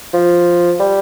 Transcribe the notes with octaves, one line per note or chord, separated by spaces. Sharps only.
F3
G3